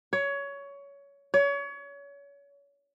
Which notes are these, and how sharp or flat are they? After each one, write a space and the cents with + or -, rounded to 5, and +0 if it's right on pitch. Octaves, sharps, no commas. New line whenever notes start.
C#5 +20
C#5 +30